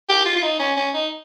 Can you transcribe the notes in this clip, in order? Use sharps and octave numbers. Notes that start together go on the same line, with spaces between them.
G4
F4
F4
D#4
C#4
C#4
D#4